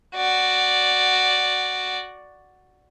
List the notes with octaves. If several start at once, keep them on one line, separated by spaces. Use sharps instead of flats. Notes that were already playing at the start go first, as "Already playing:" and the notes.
F#4 D5